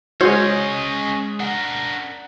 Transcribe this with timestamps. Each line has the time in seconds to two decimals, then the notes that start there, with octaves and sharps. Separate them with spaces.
0.21 G#3 C#4 F#4 G#4 C5 C#5 D#5
1.40 D4 A#4 F#5